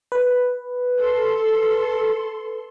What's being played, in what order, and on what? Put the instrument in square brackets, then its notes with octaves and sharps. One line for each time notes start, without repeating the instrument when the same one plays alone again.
[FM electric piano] B4
[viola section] A4 C6